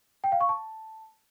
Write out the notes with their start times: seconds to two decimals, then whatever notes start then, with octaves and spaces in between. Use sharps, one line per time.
0.24 G5
0.32 F5
0.41 C#6
0.49 A5